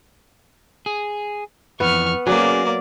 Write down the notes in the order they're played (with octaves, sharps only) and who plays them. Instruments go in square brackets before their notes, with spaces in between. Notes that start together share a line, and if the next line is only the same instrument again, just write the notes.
[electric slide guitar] G#4
[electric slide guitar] F2 E3 [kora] B3 [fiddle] C#6 F6
[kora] F#3 [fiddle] A#3 D5 [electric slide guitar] C#4 G#4